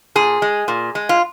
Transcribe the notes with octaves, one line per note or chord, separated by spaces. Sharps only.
A#2 G#4
G#3
A#2
G#3
F4